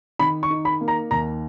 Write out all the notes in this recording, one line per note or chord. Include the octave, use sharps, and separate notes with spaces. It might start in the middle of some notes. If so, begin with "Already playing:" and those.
D#3 B5
C#6
D#4
B5
A#3
A#5
D#2 A#5